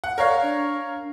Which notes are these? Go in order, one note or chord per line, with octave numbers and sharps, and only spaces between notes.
F#5
A#4 C#5 D5 F5
D4